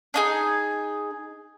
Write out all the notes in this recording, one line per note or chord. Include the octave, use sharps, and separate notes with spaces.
D4 D#4 G#4